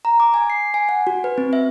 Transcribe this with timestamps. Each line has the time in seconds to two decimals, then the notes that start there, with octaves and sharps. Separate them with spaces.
0.05 A#5
0.20 D6
0.34 G#5
0.50 C7
0.74 G#5
0.89 F#5
1.07 F#4
1.24 B4
1.38 C4
1.53 E5